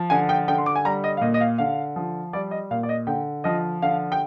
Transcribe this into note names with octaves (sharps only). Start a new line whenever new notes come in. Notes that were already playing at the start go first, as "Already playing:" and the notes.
Already playing: F3
D3 G#5
G5
D3 G5
C6
D6
G#5
G3 A#5
D#5
F5
A#2 D#5
D#5
F5
D3 F5
F3
G3 D5
D#5
A#2 F5
D5
D#5
D3 G5
F3 D#5
D3 F5
G5